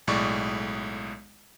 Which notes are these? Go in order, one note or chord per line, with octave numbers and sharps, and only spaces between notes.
B1 A2 G#3 D5 C#6